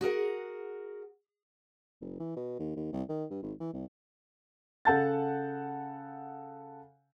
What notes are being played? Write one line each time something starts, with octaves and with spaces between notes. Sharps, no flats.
F#4 G#4 A#4 F#5
F#1
E3
B2
D#2
D#2
C2
D#3
G2
G#1
E3
C2
C#3 A4 F#5 A5 G6 A6